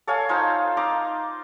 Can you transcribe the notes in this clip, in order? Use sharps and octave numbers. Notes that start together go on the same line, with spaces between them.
A4 C#5 F5 G#5
D#4 F4 C5 A5
D#4 A#5 C6 D6